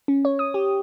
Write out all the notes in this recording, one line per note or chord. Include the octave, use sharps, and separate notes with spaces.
C#4
C#5
D#6
G4